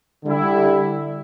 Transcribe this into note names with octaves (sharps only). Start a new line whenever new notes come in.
D3 G3 E4